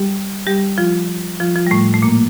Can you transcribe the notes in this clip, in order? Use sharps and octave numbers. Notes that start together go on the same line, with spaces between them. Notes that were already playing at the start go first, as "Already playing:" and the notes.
Already playing: G3 G4
G3 G4
F3 F4
F3 F4
F3 F4
G3
A2 A3
A3
A#2 A#3